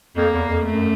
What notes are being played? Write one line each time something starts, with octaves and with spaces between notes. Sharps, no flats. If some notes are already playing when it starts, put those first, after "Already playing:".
F2 A#3
E2
F2
F#2 A3